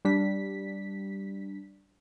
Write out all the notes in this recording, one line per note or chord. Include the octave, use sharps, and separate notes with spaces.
G3 D4 B6